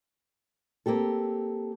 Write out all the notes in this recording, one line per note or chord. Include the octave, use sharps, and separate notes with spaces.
A#3 C4 G4 A4